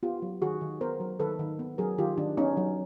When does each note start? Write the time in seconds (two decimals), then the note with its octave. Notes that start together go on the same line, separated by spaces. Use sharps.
0.03 B3 F4 G4
0.22 F#3
0.42 D#3 F#4 G#4
0.61 D#3
0.81 B3 A#4 C5
1.00 F#3
1.20 D#3 A4 B4
1.39 D#3
1.59 B3
1.78 F#3 G#4 A#4
1.98 D#3 F4 G4
2.18 D#3 D4
2.37 B3 C#4 D#4
2.57 F#3